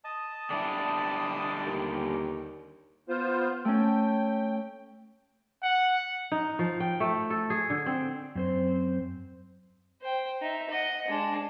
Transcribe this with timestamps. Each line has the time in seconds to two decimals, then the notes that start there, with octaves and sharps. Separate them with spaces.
0.04 D#5 A5 D#6
0.50 D3 G3 D4 E4
1.66 D#2
3.09 B3 F4 C5
3.65 A3 C#4 G5
5.63 F#5
6.32 D#4
6.59 F3
6.80 G5
7.00 A3
7.30 A4
7.50 G#4
7.70 D3
7.86 C4
8.35 F#2 C4 C5
10.01 C5 G5
10.41 D#4 E5
10.70 D#5 F#5
11.08 G#3 D4